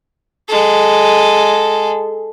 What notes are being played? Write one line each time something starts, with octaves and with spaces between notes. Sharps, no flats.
G#3 A4